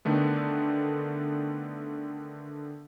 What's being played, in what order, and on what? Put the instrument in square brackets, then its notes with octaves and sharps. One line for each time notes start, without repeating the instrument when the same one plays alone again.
[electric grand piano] D3 D#3 A3 B3